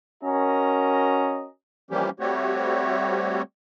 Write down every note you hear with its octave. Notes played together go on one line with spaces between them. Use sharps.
C#4 F#4 A#4 D#5 A#5
E3 F3 G3 A#3 C#4 G4
G3 A3 C4 F#4 G4 C#5